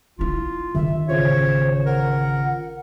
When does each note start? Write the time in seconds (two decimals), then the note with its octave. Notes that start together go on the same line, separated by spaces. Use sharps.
0.19 D4 E4 F4
0.75 D#3 E5
1.09 A1 C#3 F4 C5 C#5
1.86 A#4 F#5